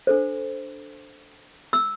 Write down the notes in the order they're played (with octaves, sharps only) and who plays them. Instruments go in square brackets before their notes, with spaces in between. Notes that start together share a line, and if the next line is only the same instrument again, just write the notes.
[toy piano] D4 A4 C5
E6